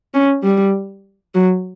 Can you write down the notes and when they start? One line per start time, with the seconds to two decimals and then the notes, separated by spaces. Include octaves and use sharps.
0.14 C#4
0.44 G3
1.34 F#3